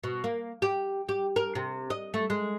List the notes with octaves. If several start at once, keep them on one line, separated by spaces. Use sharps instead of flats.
B2
A#3
G4
G4
A#4
C3
D#5
A3
G#3